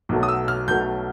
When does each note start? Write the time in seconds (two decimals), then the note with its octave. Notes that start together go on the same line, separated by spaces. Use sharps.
0.09 B1 B2 F#3 A3
0.23 D#6
0.28 E6
0.48 F6
0.67 B1 B2 F#3 A3 G6